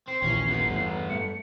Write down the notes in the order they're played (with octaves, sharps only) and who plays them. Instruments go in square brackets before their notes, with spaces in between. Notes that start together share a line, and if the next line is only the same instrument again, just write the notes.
[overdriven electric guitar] C4 [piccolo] C7
[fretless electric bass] A#1 D#2 E3 [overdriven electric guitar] C#4
[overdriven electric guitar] G2 B3
[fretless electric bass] E2 A2
[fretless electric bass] A3 [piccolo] C#7